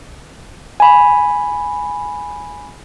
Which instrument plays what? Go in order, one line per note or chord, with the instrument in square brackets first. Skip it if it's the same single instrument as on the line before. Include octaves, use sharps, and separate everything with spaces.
[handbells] G#5 B5